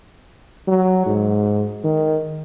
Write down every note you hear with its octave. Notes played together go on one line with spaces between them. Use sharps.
F#3
G#2
D#3